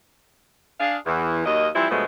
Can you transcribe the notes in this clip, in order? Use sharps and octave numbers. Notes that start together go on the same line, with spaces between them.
D4 G#4 F5
E2 E3
D#2 F#3 A#3 D#5
E3 F3 G3 C4 E4
G2 B2 F3 F#3 G#3 A3